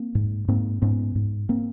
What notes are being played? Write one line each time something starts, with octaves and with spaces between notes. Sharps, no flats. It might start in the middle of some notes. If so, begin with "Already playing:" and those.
Already playing: A#3 C4
G#2
G#2 A#3 C4
G#2 B3 C#4
G#2
A#3 C4